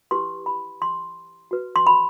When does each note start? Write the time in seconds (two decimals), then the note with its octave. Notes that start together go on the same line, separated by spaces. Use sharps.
0.11 E4 G4 B4 C6
0.46 B5
0.82 C6
1.51 F#4 B4
1.76 C6
1.87 B5